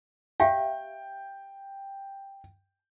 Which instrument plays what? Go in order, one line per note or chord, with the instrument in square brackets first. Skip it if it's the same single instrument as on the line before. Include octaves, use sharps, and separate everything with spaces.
[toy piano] G4 E5 F5 [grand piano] G5